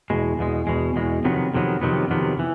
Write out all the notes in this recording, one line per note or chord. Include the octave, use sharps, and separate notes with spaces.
E2 B2 G#3
E2 B2 G#3
E2 B2 G#3
E2 B2 G#3
F2 C3 D#3 F#3 B3
F2 C3 D#3 F#3 B3
F2 C3 D#3 F#3 B3
F2 C3 D#3 F#3 B3
E3